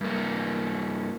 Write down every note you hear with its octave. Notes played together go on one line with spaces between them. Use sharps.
G2 A#3